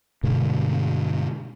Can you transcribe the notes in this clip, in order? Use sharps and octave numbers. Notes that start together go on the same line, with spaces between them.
G2 B2 D3 G#3